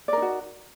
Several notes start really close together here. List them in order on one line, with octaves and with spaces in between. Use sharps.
D5 A#4 D#4 F#4